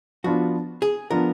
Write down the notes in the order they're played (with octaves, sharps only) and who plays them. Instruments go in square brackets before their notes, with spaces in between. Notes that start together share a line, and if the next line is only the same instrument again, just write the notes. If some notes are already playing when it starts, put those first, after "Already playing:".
[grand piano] F3 B3 D4 F4 [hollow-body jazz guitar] F#4
[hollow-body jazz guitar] G#4
[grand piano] F3 B3 D4 F4 [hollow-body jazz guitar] A#4